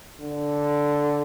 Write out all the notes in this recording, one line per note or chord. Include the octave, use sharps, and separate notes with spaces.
D3